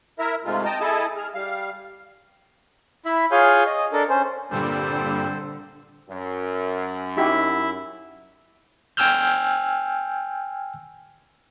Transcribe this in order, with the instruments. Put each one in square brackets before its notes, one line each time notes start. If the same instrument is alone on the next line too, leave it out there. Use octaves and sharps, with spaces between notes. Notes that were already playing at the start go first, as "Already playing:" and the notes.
[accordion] E4 A#4 E5 A#5
G#2 C3 G#3 A3 F4
D#5 G5 A5 A#5
E4 G#4 A4 D#5 A5
G#4 F6
G3 F5
[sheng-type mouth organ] E4 E5 B5
F4 G#4 C#5 F5 G#5 G6
D#5
D4 A4 A#4
C#4 C5
[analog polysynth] G2 A#2 G3 [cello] D3 [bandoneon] C4 A4 C5
[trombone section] F#2
[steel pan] D#4 F#4 G4 [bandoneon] E4 E5
[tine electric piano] G5 G#5 E6 F6 G6